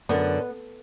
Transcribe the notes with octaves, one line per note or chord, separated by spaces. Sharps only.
F#2 D3 B3